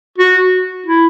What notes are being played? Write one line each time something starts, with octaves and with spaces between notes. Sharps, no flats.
F#4
E4